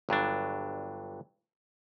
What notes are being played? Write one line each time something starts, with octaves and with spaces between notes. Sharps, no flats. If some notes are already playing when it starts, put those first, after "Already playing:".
G1 G2 F#3 D4